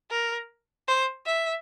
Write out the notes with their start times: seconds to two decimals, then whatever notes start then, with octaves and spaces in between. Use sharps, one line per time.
0.11 A#4
0.88 C5
1.26 E5